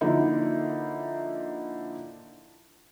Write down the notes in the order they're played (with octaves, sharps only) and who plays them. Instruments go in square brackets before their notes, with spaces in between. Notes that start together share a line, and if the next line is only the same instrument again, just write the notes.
[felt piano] D3 F3 A#3 D#4 E4